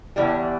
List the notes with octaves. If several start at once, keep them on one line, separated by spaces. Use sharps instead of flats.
E2 E3 G3